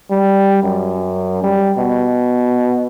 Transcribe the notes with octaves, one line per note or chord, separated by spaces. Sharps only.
G3
F#2
G3
B2